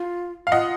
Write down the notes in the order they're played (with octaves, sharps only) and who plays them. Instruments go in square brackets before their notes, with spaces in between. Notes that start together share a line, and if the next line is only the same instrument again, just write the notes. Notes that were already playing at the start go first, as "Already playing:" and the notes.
Already playing: [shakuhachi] F4
[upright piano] F5
[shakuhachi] F4 [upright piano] D#5 F#5